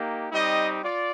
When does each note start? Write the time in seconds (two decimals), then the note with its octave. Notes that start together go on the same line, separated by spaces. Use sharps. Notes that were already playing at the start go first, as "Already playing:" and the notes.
Already playing: A#3 D#4 G4
0.31 G3 C4 D#4 G4 D#5
0.83 F4 D5